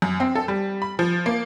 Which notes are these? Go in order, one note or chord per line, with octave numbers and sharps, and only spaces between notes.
F#2
C4
A4
G3
B5
F3
A#3